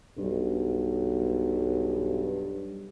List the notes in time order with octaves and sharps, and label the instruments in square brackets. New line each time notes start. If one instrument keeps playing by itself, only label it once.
[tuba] B1 [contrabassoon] G2